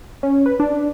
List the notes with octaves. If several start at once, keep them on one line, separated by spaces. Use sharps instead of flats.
C#4
B4
D4